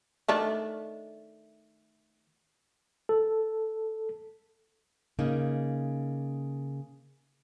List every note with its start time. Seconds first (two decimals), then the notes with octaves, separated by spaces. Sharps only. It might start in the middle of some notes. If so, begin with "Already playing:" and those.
0.28 D#3 A3 D4
3.09 A4
5.19 C#3 A#3 D#4